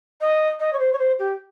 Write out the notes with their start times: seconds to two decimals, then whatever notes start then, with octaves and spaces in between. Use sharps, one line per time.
0.20 D#5
0.59 D#5
0.72 C#5
0.79 C5
0.92 C#5
0.98 C5
1.18 G4